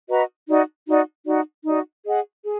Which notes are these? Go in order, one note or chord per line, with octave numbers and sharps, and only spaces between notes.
F#4 B4 D#5 A#5
D#4 F#4 D5
D#4 F#4 D5
D#4 F#4 D5
D#4 F#4 D5
G#4 D#5 F#5
G#4